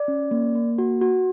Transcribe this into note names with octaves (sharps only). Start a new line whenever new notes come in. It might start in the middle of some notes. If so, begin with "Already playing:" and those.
Already playing: D5
C#4
A#3
A#3
F#4
F#4